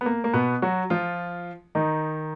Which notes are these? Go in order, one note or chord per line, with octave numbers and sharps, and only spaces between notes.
B3
A#3
A#3
B2 B3
F#3 F#4
F3 F4
D#3 D#4